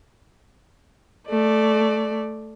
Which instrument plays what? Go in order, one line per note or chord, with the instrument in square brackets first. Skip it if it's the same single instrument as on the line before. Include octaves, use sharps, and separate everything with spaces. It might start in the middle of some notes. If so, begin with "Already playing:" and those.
[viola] A3 D5